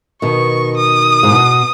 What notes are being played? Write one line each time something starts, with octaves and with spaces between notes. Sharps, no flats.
B2 D#3 C#6
D#6
G#2
B2